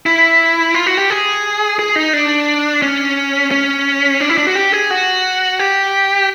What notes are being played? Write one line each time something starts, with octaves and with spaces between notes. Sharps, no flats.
E4
F4
F#4
G4
G#4
G#4
D#4
D4
C#4
C#4
D4
E4
D4
F#4
G4
G#4
F#4
G4